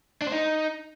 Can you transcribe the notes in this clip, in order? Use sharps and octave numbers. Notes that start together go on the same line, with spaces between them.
D4
C5
D#4